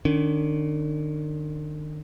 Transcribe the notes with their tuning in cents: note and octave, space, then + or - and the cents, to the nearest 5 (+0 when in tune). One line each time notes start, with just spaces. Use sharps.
D#3 -40 C#4 +45